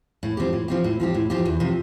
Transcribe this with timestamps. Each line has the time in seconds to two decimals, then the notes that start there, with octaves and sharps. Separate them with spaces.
0.23 A2
0.37 F3 C4 G4
0.53 A2
0.68 F3 C4 G4
0.84 A2
1.00 F3 C4 G4
1.14 A2
1.30 F3 C4 G4
1.45 E2
1.60 C3 F3